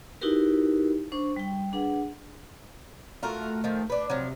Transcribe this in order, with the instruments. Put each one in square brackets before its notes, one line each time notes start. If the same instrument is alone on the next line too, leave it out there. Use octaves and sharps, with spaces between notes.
[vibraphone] D#4 E4 F#4 G4 A#4 B4
D4 C5 C#6
G3 G5
D4 G#4 B4 F#5
[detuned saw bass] A3 [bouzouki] F4 F#4 A#4
[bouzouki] D#3 F3
D4 B4
[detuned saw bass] C3 [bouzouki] F3 F#3